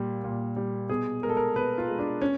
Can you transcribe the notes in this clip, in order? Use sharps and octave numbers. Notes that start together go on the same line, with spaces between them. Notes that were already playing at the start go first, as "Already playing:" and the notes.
Already playing: A#2 G3
A#2
G3
B2 G#4
G#3 A#4
A4
A#4
B2 B4
F4
G#3
D4
C#4